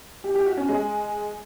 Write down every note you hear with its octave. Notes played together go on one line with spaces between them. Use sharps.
G4
G4
F#4
C#4
G#3